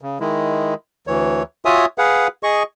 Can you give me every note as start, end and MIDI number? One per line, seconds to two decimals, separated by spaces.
0.01 0.18 49
0.20 0.74 51
0.20 0.74 56
0.20 0.74 64
1.07 1.43 38
1.07 1.43 52
1.07 1.43 73
1.65 1.86 65
1.65 1.86 66
1.65 1.86 73
1.65 1.86 76
1.65 1.86 80
1.65 1.86 87
1.98 2.28 68
1.98 2.28 71
1.98 2.28 77
1.98 2.28 78
2.43 2.63 68
2.43 2.63 75
2.43 2.63 85